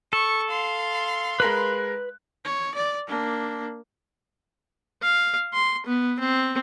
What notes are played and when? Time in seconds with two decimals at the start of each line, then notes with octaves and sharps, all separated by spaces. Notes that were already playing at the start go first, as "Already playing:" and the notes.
0.13 A4 C#6
0.51 F5 C6
1.40 G#3 A#4 B4 B5 F#6
2.45 C#5
2.75 D5
3.07 A#3 D4
5.02 F5
5.53 C6
5.86 B3
6.20 C4